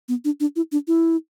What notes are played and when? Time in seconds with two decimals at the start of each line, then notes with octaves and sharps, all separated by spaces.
0.08 B3
0.24 D4
0.40 D4
0.56 E4
0.72 D4
0.87 E4